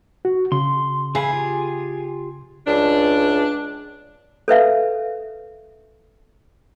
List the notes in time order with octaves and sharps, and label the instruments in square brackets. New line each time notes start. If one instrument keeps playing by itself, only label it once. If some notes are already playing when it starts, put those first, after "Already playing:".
[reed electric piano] F#4
[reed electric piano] C#3 [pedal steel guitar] C6
[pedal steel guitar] E3 F5 B5 [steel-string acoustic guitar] G#4
[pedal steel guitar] F4 G4
[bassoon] C#2 [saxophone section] D4
[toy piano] A4 B4 E5 F5